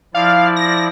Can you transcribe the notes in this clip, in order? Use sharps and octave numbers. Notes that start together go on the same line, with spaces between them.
F3 E4 D5 F5
A#6